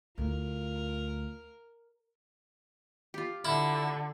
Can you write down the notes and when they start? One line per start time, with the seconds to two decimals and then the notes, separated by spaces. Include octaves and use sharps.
0.18 D2 E4 F4 A#4
3.14 F4 G4
3.45 D3 E4